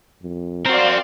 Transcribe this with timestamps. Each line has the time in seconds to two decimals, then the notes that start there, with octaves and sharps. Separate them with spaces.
0.22 F2
0.66 C4 F#4 A#4 C5 D5 F5 C6